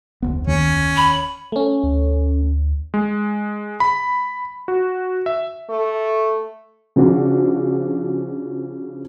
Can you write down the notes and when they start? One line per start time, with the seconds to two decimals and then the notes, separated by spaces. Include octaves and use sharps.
0.22 F1 D2 B3
0.47 D#2 C#4
0.97 B5
1.52 A3 C#4
1.83 D2
2.94 G#3
3.80 B5
4.68 F#4
5.26 E5
5.70 A3
6.96 C#3 F3 D4 F#4 G#4